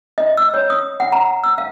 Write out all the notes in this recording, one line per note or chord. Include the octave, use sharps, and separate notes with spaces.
D#5
E6
C#5
D#6
F#5
A#5
E6
F5